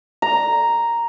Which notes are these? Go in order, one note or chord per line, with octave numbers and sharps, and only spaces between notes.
A#5